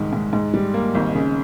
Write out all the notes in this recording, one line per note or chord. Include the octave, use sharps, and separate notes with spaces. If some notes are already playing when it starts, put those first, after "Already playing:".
Already playing: C2 G#2 D#3 G#3
G#2
G#2
G3
A#3
G#1
C#3